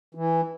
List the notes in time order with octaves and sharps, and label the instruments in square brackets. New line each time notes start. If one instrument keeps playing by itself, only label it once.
[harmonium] E3